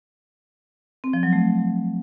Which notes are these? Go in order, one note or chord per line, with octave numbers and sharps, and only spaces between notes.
C4
F3
F#3
A3